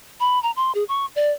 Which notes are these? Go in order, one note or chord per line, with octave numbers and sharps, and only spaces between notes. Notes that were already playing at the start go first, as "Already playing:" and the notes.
B5
A#5
C6
G#4
C#6
D5